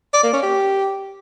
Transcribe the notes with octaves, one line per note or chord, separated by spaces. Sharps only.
D5
A#3
C#4
G4